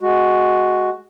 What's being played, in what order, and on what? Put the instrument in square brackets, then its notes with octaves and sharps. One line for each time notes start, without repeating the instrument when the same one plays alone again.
[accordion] G#3 F#4